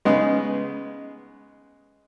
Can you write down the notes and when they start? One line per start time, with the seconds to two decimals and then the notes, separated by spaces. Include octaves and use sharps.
0.05 C#3 G#3 B3 D#4